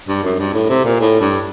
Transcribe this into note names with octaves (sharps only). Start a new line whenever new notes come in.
G2
F#2
G2
A2
C3
A#2
A2
G2